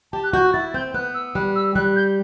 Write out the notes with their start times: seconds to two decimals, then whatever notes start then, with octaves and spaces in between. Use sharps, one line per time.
0.13 G4 A5
0.24 F#6
0.33 F#4 G6
0.53 E4 A6
0.74 C4 G6
0.94 B3 F#6
1.14 E6
1.35 G3 F#6
1.56 E6
1.76 G3 F#6
1.96 G6